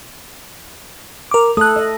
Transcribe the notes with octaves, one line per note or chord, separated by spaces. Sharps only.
A#4 D6
A3 A4 D#6 F#6
D#5